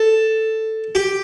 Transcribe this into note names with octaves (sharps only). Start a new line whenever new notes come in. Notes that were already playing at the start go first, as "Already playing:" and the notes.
Already playing: A4
G4